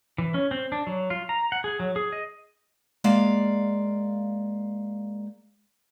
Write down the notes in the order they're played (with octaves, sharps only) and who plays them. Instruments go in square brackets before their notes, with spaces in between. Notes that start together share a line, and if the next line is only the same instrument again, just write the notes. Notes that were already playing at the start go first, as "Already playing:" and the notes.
[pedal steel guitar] E3
C#4
C4
D4
F#3
F4
A#5
F#5
G#4
F#3
G#4
D#5
[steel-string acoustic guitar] G#3 A#3 D5 F5